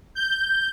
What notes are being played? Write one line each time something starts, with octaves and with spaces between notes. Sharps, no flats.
G6